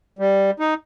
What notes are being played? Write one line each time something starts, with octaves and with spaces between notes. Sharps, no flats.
G3
D#4